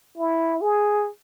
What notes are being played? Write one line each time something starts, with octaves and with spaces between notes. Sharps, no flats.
E4
G#4